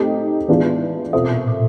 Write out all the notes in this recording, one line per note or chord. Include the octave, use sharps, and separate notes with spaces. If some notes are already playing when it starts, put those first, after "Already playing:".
Already playing: A3 C4 D#4 G4
E3 G#3 B3 D4 F4
B2 C4 F4 A4 C5 E5
A#2
A2
A#2